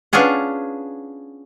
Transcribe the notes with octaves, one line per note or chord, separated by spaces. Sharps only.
B3 C#4 D4 F4 G#4 F#5